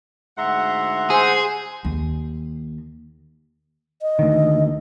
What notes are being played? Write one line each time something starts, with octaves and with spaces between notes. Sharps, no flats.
D2 G#2 E5 F#5 A#5 C6
G#4 C5 G#5
D#2
D#5
D2 D#3